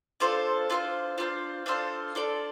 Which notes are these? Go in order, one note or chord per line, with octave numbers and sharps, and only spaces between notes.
D4 F4 A4 C5
D4 F4 A4 C5
D4 F4 A4 C5
D4 F4 A4 C5
D4 A4 D5